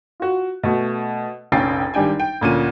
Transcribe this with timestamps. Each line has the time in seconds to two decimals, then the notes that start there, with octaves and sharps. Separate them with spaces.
0.20 F4 F#4
0.63 B2 A3
1.52 F1 A#1 C#4 G5 A6 C7
1.94 G#1 G3 D4 G5 G#5
2.20 G5
2.41 D2 A#2 C#4 D#7